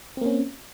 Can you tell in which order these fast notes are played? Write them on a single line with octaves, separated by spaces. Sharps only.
C4 A#3 C#4